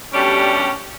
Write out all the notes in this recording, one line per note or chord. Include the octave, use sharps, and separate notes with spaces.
B2 G3 A3 C#4 D4 G4